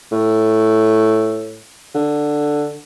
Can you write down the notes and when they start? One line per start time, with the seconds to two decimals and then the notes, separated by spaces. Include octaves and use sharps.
0.12 A2
1.95 D3